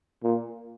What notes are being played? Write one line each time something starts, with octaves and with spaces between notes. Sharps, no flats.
A#2